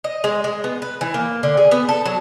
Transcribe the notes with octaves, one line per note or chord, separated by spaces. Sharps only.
D#5
G#3
G#3
B3
B4
E3
A#3
D3
G#4
B3
A4
F#3